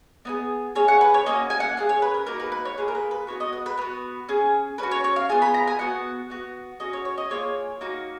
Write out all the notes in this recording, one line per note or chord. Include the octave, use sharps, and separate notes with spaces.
B3 D#4 G#4
C#4 G#4 C#5
F#5
B4
C#5
A#3 C#4 F#4 D#5
G#5
F#5
C#4 F4 G#4 F5
C#5
B4
A#4
A#3 D#4 F#4 A#4
B4
B4
C#5
A#3 F4 G#4 B4
A#4
B4
B4
D#4 F#4 C#5
B3
D#5
B4
B4
B3 F#4 B4
C#4 G#4
C#4 F#4 B4
C#5
C#5
F5
B3 F4 G#4 G#5
B5
A#5
G#5
B3 F#4 F#5
B3 F#4
C#4 F#4 D#5
C#5
C#5
D#5
A#3 F4 G#4 C#5
A#3 D#4 F#4